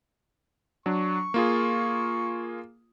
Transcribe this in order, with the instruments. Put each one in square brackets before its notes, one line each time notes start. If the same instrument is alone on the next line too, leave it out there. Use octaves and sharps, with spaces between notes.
[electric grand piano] F#3 D4 [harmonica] C#6
[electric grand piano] A#3 F4 G#4